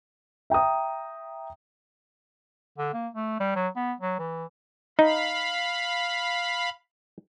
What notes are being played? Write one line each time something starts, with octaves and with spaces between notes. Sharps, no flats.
E5 G5 A#5 D#6
D3
A#3
A3
G3
F#3
B3
F#3
E3
D#4 F5 B5